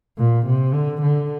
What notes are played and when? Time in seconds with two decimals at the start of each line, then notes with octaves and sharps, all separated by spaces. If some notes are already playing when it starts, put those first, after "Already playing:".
0.18 A#2
0.46 C3
0.74 D3
1.02 D3